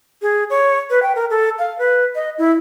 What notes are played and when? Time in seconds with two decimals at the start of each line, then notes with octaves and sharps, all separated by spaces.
0.22 G#4
0.50 C#5
0.90 B4
1.03 G5
1.15 A#4
1.30 A4
1.59 F5
1.79 B4
2.15 D#5
2.38 E4